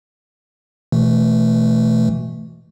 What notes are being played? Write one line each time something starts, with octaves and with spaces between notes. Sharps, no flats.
B2 E3 A3